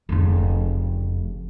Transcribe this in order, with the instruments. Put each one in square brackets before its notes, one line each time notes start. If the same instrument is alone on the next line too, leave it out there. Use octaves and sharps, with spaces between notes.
[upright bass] F1 C#3